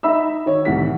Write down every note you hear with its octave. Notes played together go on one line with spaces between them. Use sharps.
D#4 E5 B5 E6
D#3 C#5
C2 A2 D#3 E3 F#5 B6